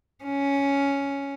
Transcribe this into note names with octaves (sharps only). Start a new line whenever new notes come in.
C#4